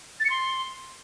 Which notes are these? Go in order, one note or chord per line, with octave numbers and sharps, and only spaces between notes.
A6
C#7
C6